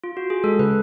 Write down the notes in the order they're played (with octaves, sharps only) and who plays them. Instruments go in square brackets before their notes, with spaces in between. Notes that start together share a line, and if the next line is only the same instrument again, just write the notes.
[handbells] F4
F#4
G#4
[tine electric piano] G#3 [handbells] A4
[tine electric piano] C#3 [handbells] B4